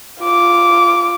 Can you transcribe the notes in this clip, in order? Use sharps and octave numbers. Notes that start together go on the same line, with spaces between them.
F4 D6